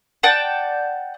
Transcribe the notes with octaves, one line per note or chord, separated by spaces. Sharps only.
D5 F#5 G5 A5